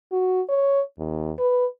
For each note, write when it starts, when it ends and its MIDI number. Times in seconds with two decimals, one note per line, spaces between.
0.12 0.41 66
0.49 0.81 73
0.99 1.32 39
1.39 1.66 71